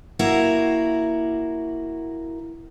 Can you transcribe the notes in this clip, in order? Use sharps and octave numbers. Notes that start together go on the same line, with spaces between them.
A#3 E4 F#4